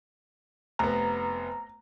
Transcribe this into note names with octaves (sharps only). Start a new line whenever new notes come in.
F1 B3 A#5